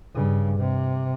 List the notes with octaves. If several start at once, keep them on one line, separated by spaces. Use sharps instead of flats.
G2 C#3
C3